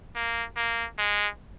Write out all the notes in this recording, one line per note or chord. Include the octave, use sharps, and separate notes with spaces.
A#3
A#3
G#3